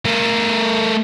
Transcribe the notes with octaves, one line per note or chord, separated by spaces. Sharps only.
A3 A#4